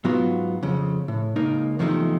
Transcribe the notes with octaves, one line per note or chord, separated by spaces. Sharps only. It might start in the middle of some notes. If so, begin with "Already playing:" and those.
G#2 F#3 B3 F4 F#4
F2 C#3
A2
C#2 A#3 D#4
E2 C3 D#3 F3 A3 D#4